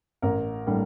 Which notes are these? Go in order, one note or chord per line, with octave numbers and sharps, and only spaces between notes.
A1 A#4
A2 G3 A#3 D4